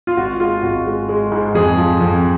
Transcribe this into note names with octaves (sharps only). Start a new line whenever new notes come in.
F4
G#1 F#4
G#3 F4
G#1 F#4
G#3
G#3
G#2
F2 G#4
F3
F2